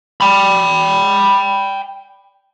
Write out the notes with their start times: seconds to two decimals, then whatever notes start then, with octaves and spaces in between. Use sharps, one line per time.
0.21 G5 B5